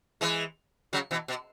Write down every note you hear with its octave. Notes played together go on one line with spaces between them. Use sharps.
E3 G#3
C#3 F#3
B2 E3
B2